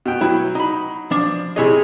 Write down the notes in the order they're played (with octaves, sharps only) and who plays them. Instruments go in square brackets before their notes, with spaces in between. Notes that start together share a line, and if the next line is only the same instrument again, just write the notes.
[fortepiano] B2 G5
[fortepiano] F#3 [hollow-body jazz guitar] E4
[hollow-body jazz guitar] D#4 B5
F3 D4
[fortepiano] C3 G#4 [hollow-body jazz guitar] E4 C#5 D#5